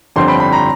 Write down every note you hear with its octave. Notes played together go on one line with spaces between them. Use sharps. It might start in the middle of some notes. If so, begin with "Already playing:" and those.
G1 F2 D3 G3 C4 C6
B5
B5
A#5